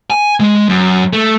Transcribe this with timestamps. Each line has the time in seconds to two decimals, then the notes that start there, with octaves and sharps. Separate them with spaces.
0.10 G#5
0.40 G#3
0.69 F#2
1.13 A3